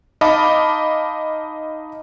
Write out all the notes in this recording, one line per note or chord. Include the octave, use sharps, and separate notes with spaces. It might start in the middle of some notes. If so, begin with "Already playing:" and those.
D#4 D#5 F5 A5 B5 D6